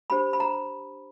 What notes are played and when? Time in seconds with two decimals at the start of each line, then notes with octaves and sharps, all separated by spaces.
0.10 D4 G4 C5 B5
0.33 B5
0.40 A#5